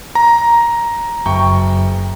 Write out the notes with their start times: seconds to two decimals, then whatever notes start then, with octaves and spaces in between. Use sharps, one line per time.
0.15 A#5
1.26 F#1 G5 C#6